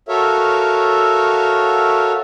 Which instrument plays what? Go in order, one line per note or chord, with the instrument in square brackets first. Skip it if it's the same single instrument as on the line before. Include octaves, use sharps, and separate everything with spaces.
[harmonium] F#4 A4 A#4 C#5 E5 F5